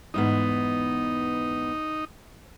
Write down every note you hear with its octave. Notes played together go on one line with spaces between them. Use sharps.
E2 G#2 B3 D#4